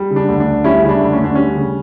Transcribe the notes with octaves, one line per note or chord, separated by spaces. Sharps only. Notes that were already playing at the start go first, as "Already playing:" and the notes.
Already playing: G3
C#3
D4
D2
D4
D2
G3 C#4 E4
C#3 E4
D4
D2
C#4
D2
D4
G3 C#4
C#3